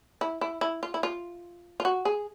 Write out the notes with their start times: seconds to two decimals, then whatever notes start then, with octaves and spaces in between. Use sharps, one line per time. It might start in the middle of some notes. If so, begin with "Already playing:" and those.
0.21 E4
0.41 E4
0.61 E4
0.83 F4
0.94 E4
1.03 F4
1.80 F4
1.85 F#4
2.05 G#4